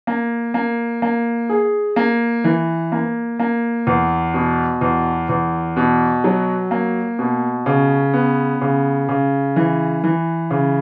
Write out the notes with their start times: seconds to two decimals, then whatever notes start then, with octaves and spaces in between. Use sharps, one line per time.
0.07 A#3
0.54 A#3
1.02 A#3
1.49 G#4
1.96 A#3
2.44 E3
2.92 A#3
3.40 A#3
3.87 E2
4.34 B2
4.81 E2
5.29 E2
5.77 B2
6.24 F#3
6.71 A#3
7.19 B2
7.66 C#3
8.14 B3
8.61 C#3
9.09 C#3
9.56 E3
10.04 E3
10.50 C#3